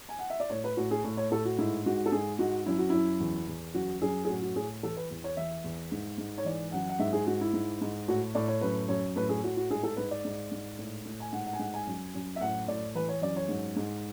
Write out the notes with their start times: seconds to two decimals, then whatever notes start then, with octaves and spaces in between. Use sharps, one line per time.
0.09 G#5
0.19 F#5
0.30 E5
0.40 D5
0.50 A2 C#5
0.64 B4
0.77 A2 F#4
0.91 G#4
1.04 A2
1.17 C#5
1.31 A2 A4
1.45 F#4
1.58 G#2 E4
1.86 G#2 F#4
2.06 A4
2.12 G#2 G#4
2.39 G#2 F#4
2.66 F#2 E4
2.78 F#4
2.90 F#2 E4
3.20 E2
3.48 E2
3.74 F#2 F#4
4.01 F#2 G#4
4.25 G#4
4.28 A2 F#4
4.42 F#4
4.56 A2 G#4
4.83 E3 A4
4.97 B4
5.11 E2
5.24 C#5
5.37 E3 E5
5.64 E2
5.92 G#2
6.18 G#2
6.38 C#5
6.45 E3 D5
6.72 F#2 F#5
6.89 F#5
6.99 G#2 E5
7.13 G#4
7.27 G#2 F#4
7.41 E4
7.54 G#2
7.81 G#2
8.08 A2 F#4
8.35 A2 D5
8.48 C#5
8.61 F#2 B4
8.88 F#2 C#5
9.16 A2 B4
9.29 G#4
9.43 A2 F#4
9.57 F#4
9.70 G#2 G#4
9.83 A4
9.97 G#2 B4
10.11 D5
10.25 G#2
10.51 G#2
10.78 A2
11.05 A2
11.20 G#5
11.33 G#2 F#5
11.47 F#5
11.53 G#5
11.59 G#2 F#5
11.74 G#5
11.87 F#2
12.14 F#2
12.36 E5
12.41 A2 F#5
12.68 A2 D5
12.95 E3 B4
13.09 C#5
13.22 F#2 D5
13.36 C#5
13.49 G#2
13.76 G#2